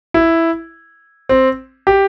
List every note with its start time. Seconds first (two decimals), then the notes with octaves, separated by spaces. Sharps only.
0.14 E4
1.29 C4
1.87 G4